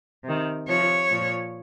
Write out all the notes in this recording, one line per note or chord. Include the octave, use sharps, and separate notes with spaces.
C3
D#3
C3 F3 C#5
A#2 F3